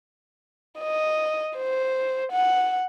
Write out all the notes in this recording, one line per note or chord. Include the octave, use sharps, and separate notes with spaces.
D#5
C5
F#5